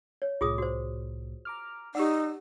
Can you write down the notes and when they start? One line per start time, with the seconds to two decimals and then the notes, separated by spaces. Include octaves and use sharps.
0.22 C#5
0.41 C2 A2 F4 G#4 D#6
0.58 F#4 C5
1.45 A#5 D6 F6
1.95 D#4 G4 D5 F#5 E6